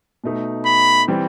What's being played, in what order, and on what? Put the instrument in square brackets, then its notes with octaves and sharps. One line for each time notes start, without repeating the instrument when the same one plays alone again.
[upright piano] B2 A3 D#4
[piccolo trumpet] B5
[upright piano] E3 G3 C4